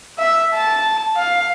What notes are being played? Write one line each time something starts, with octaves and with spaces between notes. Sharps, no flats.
E5
A5
F5